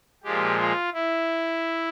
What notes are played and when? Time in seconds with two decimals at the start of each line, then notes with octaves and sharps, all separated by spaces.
0.24 A#2 F3 G#3 G4
0.58 F4
0.93 E4